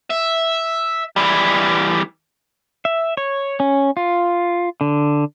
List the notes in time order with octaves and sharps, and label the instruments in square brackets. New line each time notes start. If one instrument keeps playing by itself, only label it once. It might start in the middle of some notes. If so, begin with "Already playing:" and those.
[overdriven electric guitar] E5
[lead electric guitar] E3 G3
[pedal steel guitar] E5
C#5
C#4
F4
D3